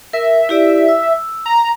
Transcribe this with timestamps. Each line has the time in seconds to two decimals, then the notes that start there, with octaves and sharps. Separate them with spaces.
0.13 A#4 E5
0.49 E4 G4 D5
0.88 E6
1.46 A#5